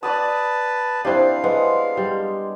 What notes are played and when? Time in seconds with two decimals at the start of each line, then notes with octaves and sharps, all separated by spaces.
0.03 B4 D5 A5 B5 D#6
1.05 C4 D4 E4 G4 F5
1.44 G#3 B3
1.97 G3